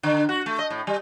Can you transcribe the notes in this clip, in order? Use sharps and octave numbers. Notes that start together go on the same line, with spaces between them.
D3
F#4
A3
D#5
A2
G3